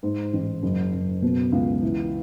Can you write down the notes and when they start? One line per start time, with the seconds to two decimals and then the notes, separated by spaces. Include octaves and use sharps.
0.03 G#2
0.33 A1
0.63 F#1
0.93 F#1
1.22 B2
1.52 C#2
1.82 E3